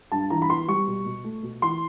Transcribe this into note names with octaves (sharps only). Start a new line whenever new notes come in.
G2 A5
E3 A#5
B5
B3 C6
G3 C#6
B2
B2
A3
B2
E3 C6